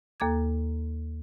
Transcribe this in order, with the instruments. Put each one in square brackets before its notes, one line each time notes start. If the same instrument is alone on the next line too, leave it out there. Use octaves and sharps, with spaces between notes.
[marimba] D#2 A#3 A4 A#5 D6 G#6